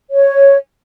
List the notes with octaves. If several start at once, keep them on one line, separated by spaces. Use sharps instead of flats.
C#5